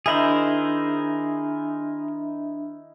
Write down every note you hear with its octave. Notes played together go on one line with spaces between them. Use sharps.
D#3 D4 E4 G#4 A#4 C5 D#5 E5